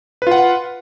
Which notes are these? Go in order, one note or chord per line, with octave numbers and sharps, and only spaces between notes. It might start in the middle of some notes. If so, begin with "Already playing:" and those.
F4 B4 F#5